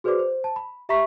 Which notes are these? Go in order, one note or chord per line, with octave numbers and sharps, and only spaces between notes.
F#4 G#4 B4 C5 D5 D6
C5
A5
B5
G4 E5 A#5 B5 C#6 B6